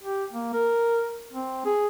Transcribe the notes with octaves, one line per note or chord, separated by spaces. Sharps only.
G4
A#3
A#4
C4
G#4